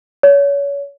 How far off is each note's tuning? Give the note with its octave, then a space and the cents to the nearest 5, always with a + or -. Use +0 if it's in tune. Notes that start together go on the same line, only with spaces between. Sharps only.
C#5 +30